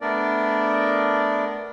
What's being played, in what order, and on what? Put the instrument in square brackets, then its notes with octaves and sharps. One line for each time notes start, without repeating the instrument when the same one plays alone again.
[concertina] A3 B3 D4 A#4 D5